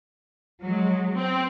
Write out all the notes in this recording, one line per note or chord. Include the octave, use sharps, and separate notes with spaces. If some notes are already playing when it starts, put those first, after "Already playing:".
F#3 G#3
C4